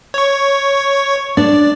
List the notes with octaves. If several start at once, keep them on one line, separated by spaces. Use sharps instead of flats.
C#5 C#6
D4 D5